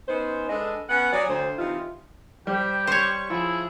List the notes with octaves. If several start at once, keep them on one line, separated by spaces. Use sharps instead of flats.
B3 C#4 D#4 C5
G#3 D4 A4 B4 D#5
B3 C#4 F#5
F#3 G#4 C#5 D5
D2 C5
C3 E3 D#4 F4
G3 G4 C5 G5
C5 C#5 C#6
F3 E4 G#4